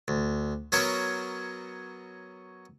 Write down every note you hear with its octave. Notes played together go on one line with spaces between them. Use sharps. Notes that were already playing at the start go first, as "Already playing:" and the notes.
D2
F#3 B3 C#4 F#4 A#4 C#5